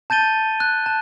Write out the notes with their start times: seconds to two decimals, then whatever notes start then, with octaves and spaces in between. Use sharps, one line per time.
0.10 A5 G6 A6 D#7 G7
0.60 F#6
0.86 A5